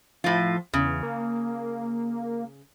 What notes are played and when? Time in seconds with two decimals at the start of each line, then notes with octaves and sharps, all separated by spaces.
0.24 A2 F3 F4
0.74 E2 C#3
1.03 A#3